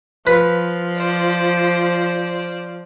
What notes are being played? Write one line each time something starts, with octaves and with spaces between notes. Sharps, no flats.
F3 B4
C5 D5